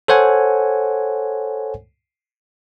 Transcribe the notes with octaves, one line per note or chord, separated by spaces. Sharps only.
A4 C5 C#5 F#5 G#5